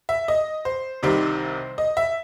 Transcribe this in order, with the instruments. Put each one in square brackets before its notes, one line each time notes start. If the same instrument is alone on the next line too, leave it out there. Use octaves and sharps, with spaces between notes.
[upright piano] E5
D#5
C5
C2 C3 D#3 G3 C4 C5
D#5
E5